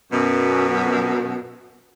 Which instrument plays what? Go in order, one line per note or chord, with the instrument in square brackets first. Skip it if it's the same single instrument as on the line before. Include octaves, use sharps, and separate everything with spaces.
[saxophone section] F#2 B2